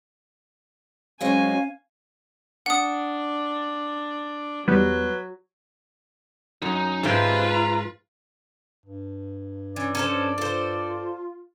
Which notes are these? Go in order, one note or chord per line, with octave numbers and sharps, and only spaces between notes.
F#3 G#3 C4 C#4 F5 G#5
D4 F#5 D#6
E2 F#3 G3 B3 B4
F#2 D#4
G#2 F3 F4 B4 C5 E5 G5
A#5
G2
E3 C#4 D5
F3 C#4 A4 C5
F4 A4 C5